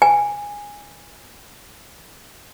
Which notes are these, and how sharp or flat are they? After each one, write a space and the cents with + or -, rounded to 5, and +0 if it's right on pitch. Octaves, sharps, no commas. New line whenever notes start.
G#5 -15